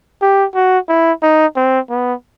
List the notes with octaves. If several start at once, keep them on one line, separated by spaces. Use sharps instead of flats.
G4
F#4
E4
D#4
C4
B3